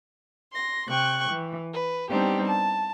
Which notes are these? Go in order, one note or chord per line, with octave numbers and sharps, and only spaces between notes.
C6 A#6
C3 G5 C#6 F#6
E3
B4
G3 B3 C4 D4 D#4 G4
A5